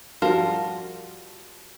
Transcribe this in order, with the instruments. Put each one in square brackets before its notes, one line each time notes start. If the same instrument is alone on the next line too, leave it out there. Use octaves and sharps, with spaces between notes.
[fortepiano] F3 G3 [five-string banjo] F4 A#4 [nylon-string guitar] F#4 [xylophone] F5 A5